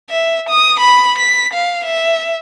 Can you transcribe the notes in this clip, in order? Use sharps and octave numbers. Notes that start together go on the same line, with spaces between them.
E5
D#6
B5
B6
F5
E5